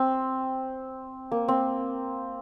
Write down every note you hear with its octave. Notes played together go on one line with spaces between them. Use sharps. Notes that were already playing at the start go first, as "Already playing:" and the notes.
Already playing: C4
A#3
C4